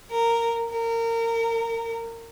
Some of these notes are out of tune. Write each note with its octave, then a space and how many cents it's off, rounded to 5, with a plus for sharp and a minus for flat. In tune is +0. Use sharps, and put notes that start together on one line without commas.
A#4 -10
A#4 -25